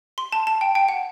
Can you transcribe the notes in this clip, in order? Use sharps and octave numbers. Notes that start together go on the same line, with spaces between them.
C6
A5
A5
G5
G5
F#5